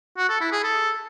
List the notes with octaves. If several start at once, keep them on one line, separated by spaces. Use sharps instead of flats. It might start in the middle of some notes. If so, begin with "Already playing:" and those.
F#4
A4
E4
G#4
A4